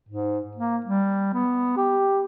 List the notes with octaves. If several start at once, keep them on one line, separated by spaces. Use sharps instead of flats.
G#2
A#3
G3
B3
G4